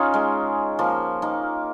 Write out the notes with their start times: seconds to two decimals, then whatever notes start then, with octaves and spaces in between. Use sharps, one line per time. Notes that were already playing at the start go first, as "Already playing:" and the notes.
Already playing: C#4 D#4 F4 G#4
0.14 G#3
0.79 F3 A#3
1.22 A#3 D#4